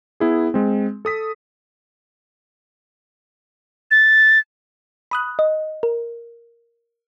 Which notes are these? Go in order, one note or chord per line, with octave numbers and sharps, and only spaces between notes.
B3 E4 G#4
G#3 C4
A4 D#6 B6
A6
B5 D#6 F#6
D#5
A#4